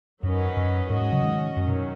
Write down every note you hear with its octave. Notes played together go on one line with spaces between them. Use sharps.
F#2 D#3 F#3 C#4 B4 D#5
F#2
G#2 C#4 F#4 D#5
G#2
C#3 F#3
D#3 G#3
F#2 D#3 F#3 C#4
F#2 B2